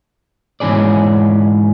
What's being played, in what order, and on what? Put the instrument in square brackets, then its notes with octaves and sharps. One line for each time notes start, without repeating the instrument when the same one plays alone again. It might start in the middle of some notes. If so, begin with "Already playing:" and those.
[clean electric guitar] G#2 E3 C#4 G#4 D5